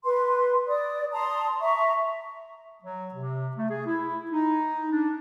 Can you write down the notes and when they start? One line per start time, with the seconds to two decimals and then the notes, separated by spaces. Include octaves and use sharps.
0.04 B4 C6
0.67 D5 D#6
1.12 A5 A#5 C6 D#6
1.61 E5 A#5 C#6
2.82 F#3
3.14 C3
3.57 A3
3.70 G#4
3.86 E4
4.30 D#4
4.92 D4